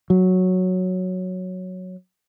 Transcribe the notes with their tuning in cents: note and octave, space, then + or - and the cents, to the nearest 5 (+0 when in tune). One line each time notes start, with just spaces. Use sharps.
F#3 -5